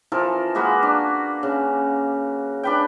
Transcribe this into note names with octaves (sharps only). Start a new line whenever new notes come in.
E3 F3 A4 A#4
G#3 A#3 F#4 B4
D4
C#3
D4 B4 G5